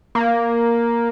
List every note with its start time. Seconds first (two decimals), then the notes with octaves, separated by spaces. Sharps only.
0.15 A#3